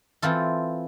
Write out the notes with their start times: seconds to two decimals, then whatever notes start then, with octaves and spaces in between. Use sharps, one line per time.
0.22 E3 C4 F4 A4